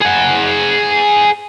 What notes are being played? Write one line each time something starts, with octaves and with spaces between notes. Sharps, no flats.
G#4 F#5